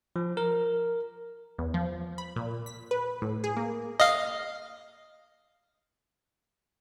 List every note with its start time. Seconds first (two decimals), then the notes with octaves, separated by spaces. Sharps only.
0.16 F3
0.37 A#4
1.58 E2
1.74 F3
2.18 B5
2.36 A#2
2.66 B6
2.91 B4
3.22 A2
3.44 G#4
3.57 A#3
4.00 D#5 F5